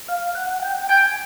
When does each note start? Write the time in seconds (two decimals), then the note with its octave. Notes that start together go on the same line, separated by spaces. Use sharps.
0.08 F5
0.35 F#5
0.63 G5
0.89 G5 G#5
1.06 G#5